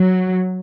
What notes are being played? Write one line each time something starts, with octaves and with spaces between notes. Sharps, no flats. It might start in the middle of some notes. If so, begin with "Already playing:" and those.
Already playing: F#3